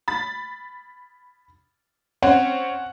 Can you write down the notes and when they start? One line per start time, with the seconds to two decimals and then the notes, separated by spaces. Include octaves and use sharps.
0.08 B5 A6
2.22 C4 C#4 F#5